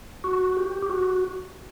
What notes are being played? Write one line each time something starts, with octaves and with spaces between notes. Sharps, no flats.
F#4
G4
G4
F#4